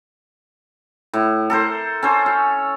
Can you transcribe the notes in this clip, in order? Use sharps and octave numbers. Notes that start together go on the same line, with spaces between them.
A2
A4 A#4 C5
C#4 A4 C5
C#5